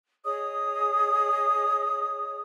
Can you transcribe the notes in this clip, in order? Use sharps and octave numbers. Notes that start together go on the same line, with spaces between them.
G#4 C#5 D#5 D#6